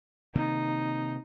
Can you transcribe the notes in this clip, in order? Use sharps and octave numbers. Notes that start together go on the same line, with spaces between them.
C3 D#3 A#3 D#4